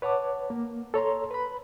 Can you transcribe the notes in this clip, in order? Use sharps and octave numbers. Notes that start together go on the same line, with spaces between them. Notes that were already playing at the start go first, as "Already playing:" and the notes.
B4 C#5 F#5 A5 D6
A#3
A4 C#5 A#5 C6
B4 B5